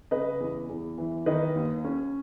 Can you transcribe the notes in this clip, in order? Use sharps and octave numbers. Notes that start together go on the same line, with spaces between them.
C#3 B4 D#5
E2
E2
E3
D#3 B4 D#5
D#2
C#4